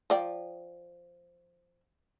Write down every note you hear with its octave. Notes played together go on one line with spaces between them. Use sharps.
F3 D5 G5